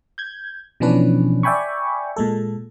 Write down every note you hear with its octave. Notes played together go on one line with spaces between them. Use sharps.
G6 G#6
B2 E3 F3 C#4 D4 B4
D5 E5 G5 G#5 B5 C#6
A#2 G#3 A4